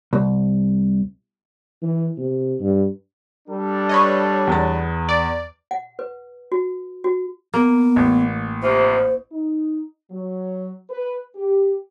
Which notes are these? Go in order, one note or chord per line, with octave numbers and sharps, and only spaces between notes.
C2
E3
C3
G2
G3 D4 A4
B4 C#5 D#5
E2 B3 A6
D5
F#5
B4
F#4
F#4
A#3 B3
A1
C3 E3 F3 C5
D#4
F#3
B4
G4